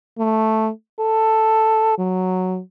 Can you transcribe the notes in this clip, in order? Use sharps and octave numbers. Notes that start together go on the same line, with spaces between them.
A3
A4
F#3